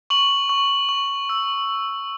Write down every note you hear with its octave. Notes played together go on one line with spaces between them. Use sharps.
C#6 F#7
C#6
C#6
E6